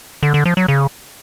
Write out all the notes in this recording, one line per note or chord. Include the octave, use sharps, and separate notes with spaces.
D3
D3
F3
F#3
C#3